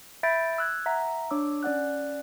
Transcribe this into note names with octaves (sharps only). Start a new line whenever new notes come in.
E5 B5 G6 A6 A#6 D7
E6 F#6 G#6
E5 F#5 A#5 B6
D4 C#5 D6 E6
C#4 D5 F#5 F#6